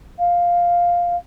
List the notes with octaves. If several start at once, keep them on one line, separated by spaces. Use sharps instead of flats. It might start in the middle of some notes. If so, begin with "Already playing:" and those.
F5